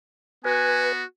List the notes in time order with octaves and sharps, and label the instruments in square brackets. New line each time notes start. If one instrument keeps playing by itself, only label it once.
[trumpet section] B3 F#4 [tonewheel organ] B4 [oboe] G#5